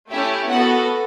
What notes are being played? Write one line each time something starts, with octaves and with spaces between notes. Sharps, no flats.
A3 C#4 E4 G4 E5
B3 F#4 A4 F#5